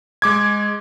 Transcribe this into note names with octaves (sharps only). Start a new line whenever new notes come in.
G#3 D6 G#6